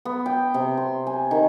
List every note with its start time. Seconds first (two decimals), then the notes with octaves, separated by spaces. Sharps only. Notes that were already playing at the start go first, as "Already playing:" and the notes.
0.05 B3
0.26 G5
0.54 C3
0.77 C6
1.07 G#5
1.31 D#3